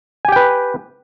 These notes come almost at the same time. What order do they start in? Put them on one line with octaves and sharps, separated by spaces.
G#5 G4 G5 B4